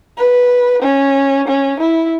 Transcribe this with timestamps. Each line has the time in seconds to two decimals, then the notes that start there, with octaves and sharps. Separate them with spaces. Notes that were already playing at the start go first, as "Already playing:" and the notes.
0.18 B4
0.83 C#4
1.48 C#4
1.80 E4